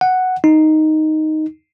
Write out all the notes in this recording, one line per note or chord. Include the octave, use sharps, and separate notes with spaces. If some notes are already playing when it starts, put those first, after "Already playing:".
F#5
D#4